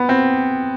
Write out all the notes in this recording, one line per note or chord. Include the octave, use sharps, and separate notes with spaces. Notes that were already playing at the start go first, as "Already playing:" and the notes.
Already playing: B3
C4